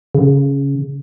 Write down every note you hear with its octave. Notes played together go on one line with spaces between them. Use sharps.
C#3